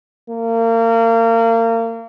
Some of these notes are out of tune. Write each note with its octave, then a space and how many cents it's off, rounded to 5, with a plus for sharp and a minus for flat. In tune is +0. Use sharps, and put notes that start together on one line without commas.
A#3 -35